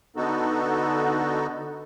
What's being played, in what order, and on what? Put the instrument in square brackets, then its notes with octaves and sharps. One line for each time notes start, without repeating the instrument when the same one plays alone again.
[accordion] D3 B3 D#4 F#4 A4